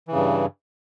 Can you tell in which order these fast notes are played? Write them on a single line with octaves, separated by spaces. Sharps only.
E3 C#3 G2